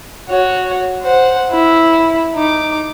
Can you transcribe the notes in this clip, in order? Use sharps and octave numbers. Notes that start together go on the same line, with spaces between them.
F#4 C#5
C5 F#5
E4
D#4 D6